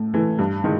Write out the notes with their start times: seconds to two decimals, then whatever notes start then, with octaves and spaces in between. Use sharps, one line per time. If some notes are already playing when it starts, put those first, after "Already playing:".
Already playing: A2 A3
0.14 E3 A3
0.39 G2
0.64 D#3 G#3